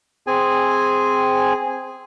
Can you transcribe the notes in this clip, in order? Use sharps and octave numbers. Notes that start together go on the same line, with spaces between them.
C4 G#4 G#5